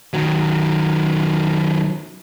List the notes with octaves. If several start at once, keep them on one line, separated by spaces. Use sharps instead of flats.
D#3 F#3